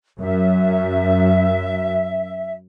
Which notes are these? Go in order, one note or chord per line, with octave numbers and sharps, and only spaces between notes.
F#2 E5